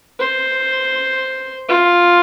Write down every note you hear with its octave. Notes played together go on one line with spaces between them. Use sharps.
C5
F4